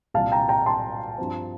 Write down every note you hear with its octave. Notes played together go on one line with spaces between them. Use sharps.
C2 A#2 G3 F5 A5
G5 A#5
G5 A#5
A5 C6
G2 F3 C4